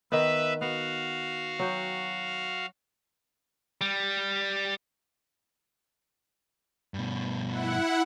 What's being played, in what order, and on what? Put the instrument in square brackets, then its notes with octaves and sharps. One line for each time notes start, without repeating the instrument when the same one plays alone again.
[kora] D#3 B3 [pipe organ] B4 E5
[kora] B3 [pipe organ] F#4 F5
[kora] F#3 G5
[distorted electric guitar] G3
[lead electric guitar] G2 B2
[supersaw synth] E4 F#5